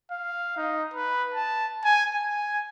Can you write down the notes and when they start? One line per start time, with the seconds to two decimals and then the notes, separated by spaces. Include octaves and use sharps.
0.11 F5
0.57 D#4
0.94 B4
1.34 A5
1.84 G#5
2.15 G#5